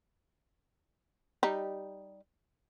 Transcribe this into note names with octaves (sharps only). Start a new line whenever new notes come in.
G3 D#4